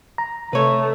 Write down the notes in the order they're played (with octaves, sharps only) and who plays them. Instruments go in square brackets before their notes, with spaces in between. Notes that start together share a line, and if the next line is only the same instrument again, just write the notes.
[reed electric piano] A#5
[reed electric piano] C3 [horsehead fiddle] A3 [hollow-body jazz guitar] B4 C#5